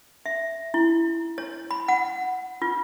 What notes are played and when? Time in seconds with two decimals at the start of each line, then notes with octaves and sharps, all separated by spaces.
0.26 E5
0.74 E4
1.38 C#5
1.71 B5
1.88 F#5
2.62 F4